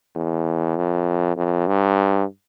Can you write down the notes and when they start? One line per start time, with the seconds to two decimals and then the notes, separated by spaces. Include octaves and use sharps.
0.15 E2
0.77 F2
1.37 F2
1.67 G2